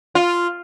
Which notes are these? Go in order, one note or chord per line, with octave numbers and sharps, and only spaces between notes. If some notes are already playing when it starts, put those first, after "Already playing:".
F4